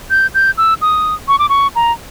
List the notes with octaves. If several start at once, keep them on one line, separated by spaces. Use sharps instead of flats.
G6
G6
E6
D#6
C#6
D6
C#6
A#5